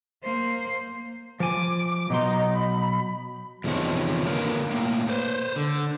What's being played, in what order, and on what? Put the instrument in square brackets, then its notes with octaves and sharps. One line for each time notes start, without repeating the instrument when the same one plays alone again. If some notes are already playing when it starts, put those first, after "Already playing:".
[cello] A#3 C5
[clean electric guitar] F3 G#5 [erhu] D6
[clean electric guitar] B2 F#3 C6 [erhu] D#4
[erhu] B5
[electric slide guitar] E2 C3 D#3 F3 C#5
D3 A#3 A#4 B4 C#5
A2 A#3
B4 C5
D3